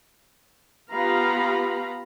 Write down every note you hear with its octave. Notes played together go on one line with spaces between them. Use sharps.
B3 F4 G4 F5 A#5 B5